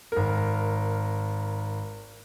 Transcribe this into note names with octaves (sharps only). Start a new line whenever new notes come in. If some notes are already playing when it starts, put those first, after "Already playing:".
G#1 A#4